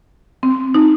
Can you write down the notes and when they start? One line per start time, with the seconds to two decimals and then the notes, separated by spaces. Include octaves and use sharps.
0.43 C4
0.74 D#4